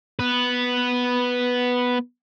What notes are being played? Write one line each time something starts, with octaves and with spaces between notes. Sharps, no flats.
B3 B4